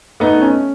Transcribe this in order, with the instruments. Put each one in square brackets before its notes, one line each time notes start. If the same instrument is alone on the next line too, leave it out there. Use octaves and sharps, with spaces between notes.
[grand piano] A3 [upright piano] B3 D#4
[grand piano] C#4